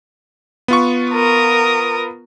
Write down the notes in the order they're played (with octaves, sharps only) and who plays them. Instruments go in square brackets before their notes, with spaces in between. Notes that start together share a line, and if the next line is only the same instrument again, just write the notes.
[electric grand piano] B3 F4 C#6
[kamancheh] A#4 D#6